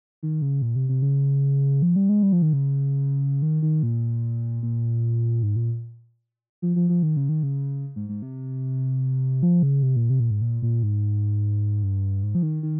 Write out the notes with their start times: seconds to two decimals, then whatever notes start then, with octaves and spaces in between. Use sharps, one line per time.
0.23 D#3
0.42 C#3
0.62 A#2
0.76 C3
0.89 C3
1.02 C#3
1.82 F3
1.96 G3
2.09 G#3
2.23 G3
2.32 F3
2.42 D#3
2.53 C#3
3.42 D#3
3.63 D#3
3.83 A#2
4.63 A#2
5.43 G#2
5.56 A#2
6.62 F3
6.76 F3
6.89 F3
7.03 D#3
7.17 C#3
7.29 D#3
7.43 C#3
7.96 G#2
8.09 G#2
8.22 C3
9.43 F3
9.63 C#3
9.83 C3
9.96 A#2
10.10 C3
10.20 A#2
10.31 G#2
10.41 A#2
10.62 A#2
10.83 G#2
11.83 G2
12.23 G#2
12.35 F3
12.43 D#3
12.63 D#3